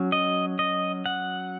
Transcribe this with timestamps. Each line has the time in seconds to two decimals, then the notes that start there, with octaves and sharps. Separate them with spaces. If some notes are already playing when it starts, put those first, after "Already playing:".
Already playing: F#3 C#4
0.12 D#5
0.59 D#5
1.06 F#5